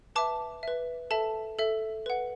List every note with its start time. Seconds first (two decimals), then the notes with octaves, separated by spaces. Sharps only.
0.15 B4 E5 A5 D6
0.63 B4 E5
1.11 A4 E5 A5
1.59 A4 E5
2.06 B4 F#5